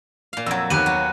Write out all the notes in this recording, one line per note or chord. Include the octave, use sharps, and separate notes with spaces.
A#2 F5
F2 F#3 E6 G#6
D#2 B3 G4 F#6 D#7
F#3